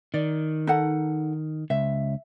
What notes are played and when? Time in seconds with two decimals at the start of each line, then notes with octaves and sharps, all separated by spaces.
0.14 D#3 D5
0.67 D#4 A4 F#5
1.70 C#2 E5